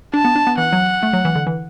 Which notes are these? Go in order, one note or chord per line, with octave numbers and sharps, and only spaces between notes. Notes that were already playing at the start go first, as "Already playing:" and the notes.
D4 A5
B3
D4
B3
E3 F#5
F#3
A3
F#3
E3
D3
E3